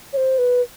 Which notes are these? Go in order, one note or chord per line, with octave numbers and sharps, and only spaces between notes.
C#5
C5
B4